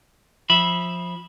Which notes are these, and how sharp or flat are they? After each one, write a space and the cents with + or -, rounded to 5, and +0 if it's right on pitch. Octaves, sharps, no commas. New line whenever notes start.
F3 +15 E5 +0 B5 -10